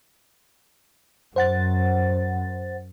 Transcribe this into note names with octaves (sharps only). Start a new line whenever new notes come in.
F#2 C5 F#5 A6